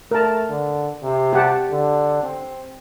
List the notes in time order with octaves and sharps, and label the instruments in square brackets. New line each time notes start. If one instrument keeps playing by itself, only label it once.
[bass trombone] A3 [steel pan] A#4 A5
[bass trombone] D3
C3
[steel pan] G4 F#5 A5
[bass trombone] D3
C4